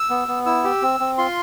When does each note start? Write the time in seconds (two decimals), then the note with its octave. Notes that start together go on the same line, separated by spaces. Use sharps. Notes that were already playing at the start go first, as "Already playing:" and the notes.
Already playing: E6
0.10 B3
0.28 B3
0.46 E4 E6
0.64 G4
0.82 C4
1.00 C4
1.18 F4 C6